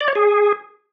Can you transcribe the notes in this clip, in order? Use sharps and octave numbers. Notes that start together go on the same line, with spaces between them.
D5
C#5
G#4